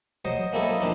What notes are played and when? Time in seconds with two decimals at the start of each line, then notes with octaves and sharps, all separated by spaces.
0.25 F#3 C5 D#5
0.53 A#3 C4 E4 A4 D#5
0.80 A#2 F3 D4 D#4